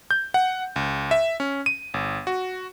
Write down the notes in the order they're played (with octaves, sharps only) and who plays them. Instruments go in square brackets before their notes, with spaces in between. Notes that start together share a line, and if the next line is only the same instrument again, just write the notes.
[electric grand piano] G6
F#5
C#2
E5
C#4
D#7
G1
F#4